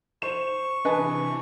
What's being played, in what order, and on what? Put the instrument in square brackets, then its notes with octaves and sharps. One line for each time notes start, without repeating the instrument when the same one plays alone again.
[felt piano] C5 E7 [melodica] C#6
[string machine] C3 E3 [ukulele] D4 G#4 B4 [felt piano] D#5 G#5 A5